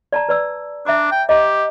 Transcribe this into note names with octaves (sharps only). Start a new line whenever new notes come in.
D5 A5 A#5
B4 D5 E6
D4 E5 A#5 D6
G5
G4 D#5 A#5